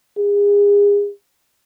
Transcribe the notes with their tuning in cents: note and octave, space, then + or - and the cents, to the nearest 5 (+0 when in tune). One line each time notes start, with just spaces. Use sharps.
G#4 -35